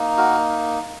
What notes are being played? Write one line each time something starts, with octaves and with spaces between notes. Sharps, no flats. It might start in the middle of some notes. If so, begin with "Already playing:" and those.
Already playing: A#3 D#4
F#4 A#4